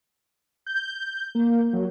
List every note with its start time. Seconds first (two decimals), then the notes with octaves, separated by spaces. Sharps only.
0.66 G6
1.35 A#3
1.73 F#3